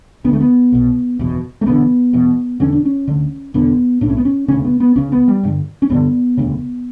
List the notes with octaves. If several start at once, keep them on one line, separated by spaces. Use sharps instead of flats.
D2 D3 A3 B3
B3
B1 B2
F#1 E2 B2
A3
E1 E2 D3 B3
E1 E2 B2
E1 E2 D3 C#4
D4
C#4
D2 D3
E1 E2 D3 B3
B1 A2 D4
C#4
B3
C#4
E1 D2 C#3 C#4
B3
B3
C#2 C#3 C#4
B3
G3
A1 G2 D3
C#4
A1 G2 D3 B3
E1 D2 C#3